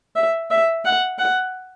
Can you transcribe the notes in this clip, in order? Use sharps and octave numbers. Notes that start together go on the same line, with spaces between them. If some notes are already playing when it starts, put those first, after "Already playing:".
E5
E5
F#5
F#5